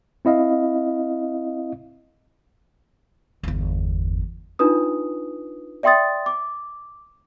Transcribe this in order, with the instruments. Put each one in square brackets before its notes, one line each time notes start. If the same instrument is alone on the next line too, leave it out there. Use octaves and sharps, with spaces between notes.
[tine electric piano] C4 E4 D#5 F5
[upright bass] G1 E2
[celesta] D4 D#4 F4 B4 D#6
D5 E5 G5 C6 D#6 A6
D6